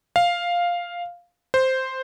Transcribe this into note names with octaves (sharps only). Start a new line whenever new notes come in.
F5
C5